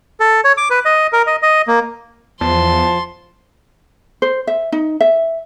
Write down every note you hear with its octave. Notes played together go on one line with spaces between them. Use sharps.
A4
C#5
D6
B4
D#5
A#4
D#5
D#5
A#3
E2 F3 A5 C6
C5
E5
D#4
E5